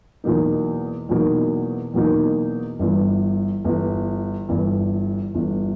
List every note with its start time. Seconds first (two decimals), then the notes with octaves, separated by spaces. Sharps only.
0.24 E2 B2 F#3 A#3 D#4
1.09 E2 B2 F#3 A#3 D#4
1.94 E2 B2 F#3 A#3 D#4
2.79 G1 G2 E3
3.65 G1 G2 E3
4.49 G1 G2 E3
5.34 G1 G2 E3